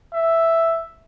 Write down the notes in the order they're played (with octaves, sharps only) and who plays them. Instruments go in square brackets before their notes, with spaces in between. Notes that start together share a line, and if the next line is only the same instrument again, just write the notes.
[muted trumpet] E5